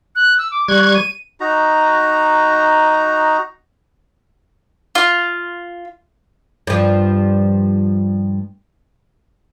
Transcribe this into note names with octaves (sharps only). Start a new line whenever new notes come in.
F#6
E6
D6
G3 C#6 F#6 G#6
D#7
D#4 F#4 A#5
F4
G2 F3